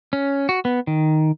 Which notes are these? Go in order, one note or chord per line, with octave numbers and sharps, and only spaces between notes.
C#4
F#4
B3
D#3